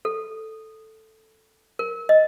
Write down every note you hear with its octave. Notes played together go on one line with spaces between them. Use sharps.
A4
A#4
D#5